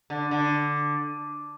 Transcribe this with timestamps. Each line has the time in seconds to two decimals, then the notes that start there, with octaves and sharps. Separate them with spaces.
0.10 D3
0.31 D3